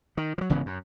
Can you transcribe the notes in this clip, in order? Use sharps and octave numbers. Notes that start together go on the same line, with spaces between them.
D#3
F3 F#3
G#1 C#3 E3 B3
F#2